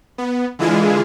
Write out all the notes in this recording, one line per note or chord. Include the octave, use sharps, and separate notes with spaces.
B3
D3 E3 G#3 E4 F4 G#4